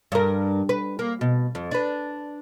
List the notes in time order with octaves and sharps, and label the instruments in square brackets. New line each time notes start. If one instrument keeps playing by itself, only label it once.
[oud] G2 A#4
B4
A#3
B2
F2
D4 B4